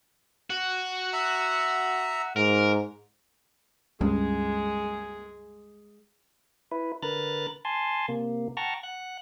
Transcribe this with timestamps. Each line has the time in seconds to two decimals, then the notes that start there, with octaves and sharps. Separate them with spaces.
0.50 F#4
1.13 E5 A#5
2.36 G#2 A#4
4.01 C#2 G2 C#3 G#3 G#4
6.71 E4 B4
7.02 D3 A#4 B4 F6 F#6 A6
7.65 G#5 A5 C6
8.08 C3 A#3
8.57 F#5 G5 A5 A#5 C#6 F6
8.83 F#5 F#6